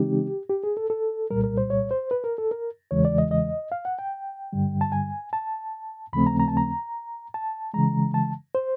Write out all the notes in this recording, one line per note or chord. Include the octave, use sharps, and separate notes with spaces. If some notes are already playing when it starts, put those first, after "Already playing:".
Already playing: C#3 E3 G#3 C4 D#4 G4
G4
G#4
A4
A4
C2 A#2 G3 A#4
A#4
C5
C#5
C5
B4
A#4
A4
A#4
E2 C#3 E3 G#3 C#5
D5
D#5
D#5
F5
F#5
G5
G2 D3 G3
A5
G#5
A5
D#2 C#3 F3 A3 C4 B5
A#5
A#5
A5
A#5
A5
C#3 E3 G#3 A#5
A5
C5